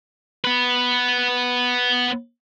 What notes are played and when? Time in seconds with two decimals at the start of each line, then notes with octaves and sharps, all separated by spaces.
0.45 B3 B4